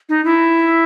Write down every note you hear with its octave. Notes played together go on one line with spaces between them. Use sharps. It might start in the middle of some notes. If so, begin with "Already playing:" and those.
D#4
E4